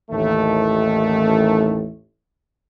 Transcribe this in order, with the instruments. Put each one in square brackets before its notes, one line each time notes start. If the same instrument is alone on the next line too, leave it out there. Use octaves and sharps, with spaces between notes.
[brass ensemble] A1 D#2 D#3 A3